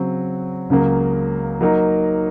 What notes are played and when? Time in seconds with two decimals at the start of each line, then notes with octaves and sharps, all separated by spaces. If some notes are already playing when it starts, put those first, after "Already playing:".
Already playing: C#3 F#3 C4 F#4
0.70 C#2 C#3 F#3 A#3
1.61 F#3 A#3 D#4 A#4